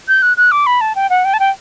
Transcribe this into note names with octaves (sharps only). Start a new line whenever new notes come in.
G6
F#6
F#6
D6
B5
A5
G5
F#5
G5
A5
G5